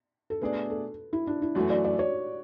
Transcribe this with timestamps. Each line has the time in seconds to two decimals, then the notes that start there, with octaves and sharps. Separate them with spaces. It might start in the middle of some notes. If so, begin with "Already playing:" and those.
0.30 A4
0.41 B2 A3 D4 G#4 B4 D5
0.70 A4
1.13 E4
1.27 D4
1.42 E4
1.55 F#2 E3 A3 F#4
1.70 D5
1.85 D5
1.99 C#5